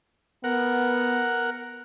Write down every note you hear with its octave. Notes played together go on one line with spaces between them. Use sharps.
B3 A#4 F#5